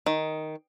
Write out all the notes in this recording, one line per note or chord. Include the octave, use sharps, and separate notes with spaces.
D#3